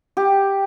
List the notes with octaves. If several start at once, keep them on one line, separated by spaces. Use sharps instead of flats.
G4